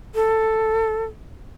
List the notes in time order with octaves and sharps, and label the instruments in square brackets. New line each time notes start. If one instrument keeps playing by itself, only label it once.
[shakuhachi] A4